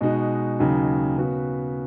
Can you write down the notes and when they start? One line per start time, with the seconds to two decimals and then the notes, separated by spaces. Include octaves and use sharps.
0.01 B2 G#3 D#4 F#4
0.59 D#2 C#3 F#3 D#4
1.18 C#3 B3 F#4